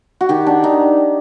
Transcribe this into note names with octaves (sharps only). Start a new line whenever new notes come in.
F#4
D#3 G4
D4
D#3 D#4